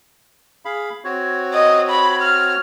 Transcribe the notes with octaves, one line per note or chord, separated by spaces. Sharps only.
G#4 F5 B5
C4 F#4 C#5
D#5
B5
F6